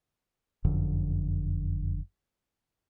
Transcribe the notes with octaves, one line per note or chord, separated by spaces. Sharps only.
F#1 F2 D3